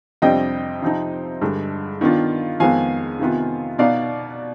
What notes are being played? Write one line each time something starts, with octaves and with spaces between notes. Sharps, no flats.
F2 C3 G3 D4 D#5 G5
C3 F3 C4 D#4
G2 D3 G#3
D#3 B3 D4 F4
F2 D#3 G#3 B3 F5 G#5
C3 D#3 B3 F4
B2 B3 D#4 D5 F5